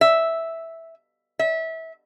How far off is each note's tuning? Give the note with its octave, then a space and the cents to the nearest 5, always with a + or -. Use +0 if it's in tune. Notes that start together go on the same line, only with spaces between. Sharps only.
E5 -5
E5 -25